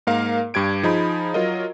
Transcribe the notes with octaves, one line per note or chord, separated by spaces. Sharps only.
G#2 A#3 A#4 F5
G2 G4 G#6 D7
F3 D#4 G#4 B5
F#3 F4 A#4 D#5